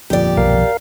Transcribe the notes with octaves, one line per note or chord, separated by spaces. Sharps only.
G1 F2 A#2 G4 D5
B1 F3 A#4 F5